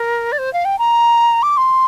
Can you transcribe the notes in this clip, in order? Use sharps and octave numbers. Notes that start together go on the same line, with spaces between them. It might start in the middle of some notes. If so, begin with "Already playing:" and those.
Already playing: A#4
D5
C5
F5
G5
A#5
D6
C6